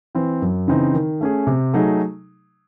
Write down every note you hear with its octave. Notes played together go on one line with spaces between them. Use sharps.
E3 C4
F#2
C#3 E3 C4 D#4
D#3
A3 C#4 G#4
C3
F#3 A3 D#4 G#4